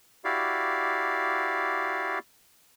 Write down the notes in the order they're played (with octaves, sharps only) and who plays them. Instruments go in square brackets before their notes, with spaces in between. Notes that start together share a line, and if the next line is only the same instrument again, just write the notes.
[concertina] E4 F#4 G4 D5 F5